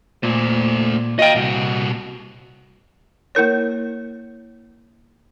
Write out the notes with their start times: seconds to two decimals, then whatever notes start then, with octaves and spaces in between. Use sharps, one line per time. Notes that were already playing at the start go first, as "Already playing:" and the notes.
0.23 A#2 A3 C5
1.19 F#4 D#5 F5 G5
1.35 C2 A#2 F#4
3.35 A#3 E4 A#4 C#5